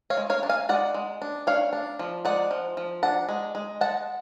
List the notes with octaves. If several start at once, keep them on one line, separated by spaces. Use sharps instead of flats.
C#5 F5
G#3
C#5 F5
D4
F5 G#5
G#3 D5 F#5
G#3
D4
D4 C#5 F5
D4
F3
G#3 D5 F#5
F3
F3
D4 F#5 A5
G#3
G#3
G#3 F#5 A5